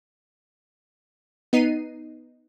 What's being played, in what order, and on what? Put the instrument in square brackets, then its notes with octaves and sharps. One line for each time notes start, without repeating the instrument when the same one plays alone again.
[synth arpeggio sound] B3 D#4 C7 D#7